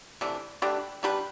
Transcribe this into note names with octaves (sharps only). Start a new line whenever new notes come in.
C3 E3 A3 D4
A3 D4 G4 B4
G3 D4 G4 B4